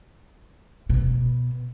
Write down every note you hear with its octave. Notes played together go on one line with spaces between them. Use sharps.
B2